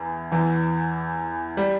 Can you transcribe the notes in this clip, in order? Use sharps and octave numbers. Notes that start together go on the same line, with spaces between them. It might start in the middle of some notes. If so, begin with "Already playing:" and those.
Already playing: E2 E3
E2 E3
G3